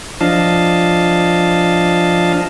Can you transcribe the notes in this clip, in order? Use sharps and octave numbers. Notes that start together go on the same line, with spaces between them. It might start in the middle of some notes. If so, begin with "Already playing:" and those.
F3 D4 D#5 F5 A5